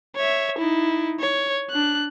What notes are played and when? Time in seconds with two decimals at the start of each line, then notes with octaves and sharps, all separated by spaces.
0.16 C#5 E5
0.58 D#4 E4
1.20 C#5
1.71 D4 F#6